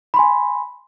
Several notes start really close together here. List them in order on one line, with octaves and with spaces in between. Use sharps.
B5 C6 G#5